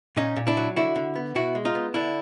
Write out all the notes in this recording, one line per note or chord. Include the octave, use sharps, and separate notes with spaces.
A#2 C#4 D#4
A#2
D4 E4
F#3
D3 E4 F#4
D3
B3
B2 E4 F#4
G#3
D#4 F4
B3
D3 D4 E4